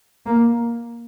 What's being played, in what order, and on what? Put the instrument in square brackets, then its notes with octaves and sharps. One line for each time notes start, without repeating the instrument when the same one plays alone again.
[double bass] A#3